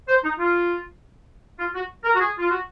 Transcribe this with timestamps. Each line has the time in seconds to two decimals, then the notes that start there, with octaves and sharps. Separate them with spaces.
0.09 C5
0.23 D#4
0.39 F4
1.59 F4
1.75 F#4
2.04 A#4
2.15 F#4
2.19 G#4
2.39 F4
2.50 F#4